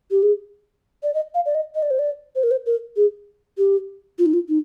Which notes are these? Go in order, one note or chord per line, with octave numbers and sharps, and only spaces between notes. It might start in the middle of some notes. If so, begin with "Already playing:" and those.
G4
G#4
D5
D#5
F5
D5
D#5
D#5
D5
C5
D5
C5
A#4
C5
A#4
G#4
G4
F4
D#4
F4
D#4